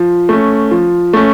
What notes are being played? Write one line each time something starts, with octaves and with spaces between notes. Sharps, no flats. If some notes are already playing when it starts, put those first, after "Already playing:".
Already playing: F3
A3 C#4
F3
A3 C#4